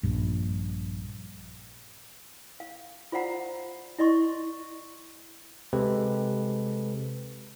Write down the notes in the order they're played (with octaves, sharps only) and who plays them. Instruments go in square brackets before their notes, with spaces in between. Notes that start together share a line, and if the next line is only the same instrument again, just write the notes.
[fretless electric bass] A#1 G2
[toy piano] F5
F4 C5 D5 F5 F#5 A#5
E4 D5 D#5 C6 C#6
[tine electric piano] C3 G#3 C4 G4 A4 B4